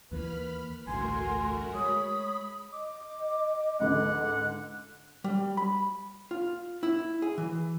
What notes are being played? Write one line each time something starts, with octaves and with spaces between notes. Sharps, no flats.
D#2 E3 A#3 B4 B5 F6
A1 D2 G2 A3 F#4 A#4 G#5 C6
G#3 C#5 B5 D#6
D#5 D6
C#2 G#2 D3 F#5
G3
B5
F4
E4
G#4
E3